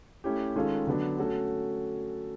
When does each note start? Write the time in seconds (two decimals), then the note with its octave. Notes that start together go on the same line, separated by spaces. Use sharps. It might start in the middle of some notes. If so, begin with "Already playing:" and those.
0.24 A3 C#4 E4 G4
0.56 D#3 G#3 C#4 F4 A4
0.87 D3 F#3 B3 D4
1.18 A3 C#4 F#4 A4